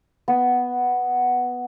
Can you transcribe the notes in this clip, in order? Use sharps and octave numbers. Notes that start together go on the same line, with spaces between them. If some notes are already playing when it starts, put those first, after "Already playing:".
B3